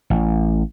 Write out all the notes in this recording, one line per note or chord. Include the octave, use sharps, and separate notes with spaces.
A1